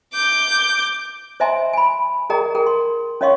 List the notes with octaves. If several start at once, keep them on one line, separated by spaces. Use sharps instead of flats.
D6 G6
C5 D#5 E5 G#5 A#5 C6
G#5 B5
G#4 A#4 D5 D#5 G5 A#5
G#4 A#4 G5
C6
C#4 C#5 D#5 F5 C6 C#6